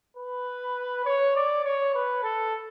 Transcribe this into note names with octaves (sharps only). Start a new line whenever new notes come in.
B4
C#5
D5
C#5
B4
A4